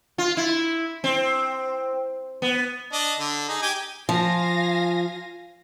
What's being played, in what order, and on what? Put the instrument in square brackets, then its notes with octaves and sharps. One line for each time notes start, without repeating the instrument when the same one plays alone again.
[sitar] F4
E4
C4
B3
[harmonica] D4 D#5
D3
D#4 G#4
G4 G5 G#5
[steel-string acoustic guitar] F3 [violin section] F5 G#5 A#6